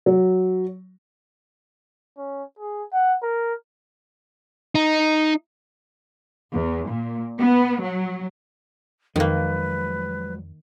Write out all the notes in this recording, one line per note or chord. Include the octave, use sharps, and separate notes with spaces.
F#3
C#4
G#4
F#5
A#4
D#4
E2
A#2
B3
F#3
F2 D#3 F3 F#3 G#3 A#3 B4